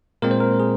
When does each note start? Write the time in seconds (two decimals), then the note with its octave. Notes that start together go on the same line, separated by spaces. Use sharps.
0.22 A#2 G#3 C4 A#4
0.31 C5
0.40 A#4
0.60 G#4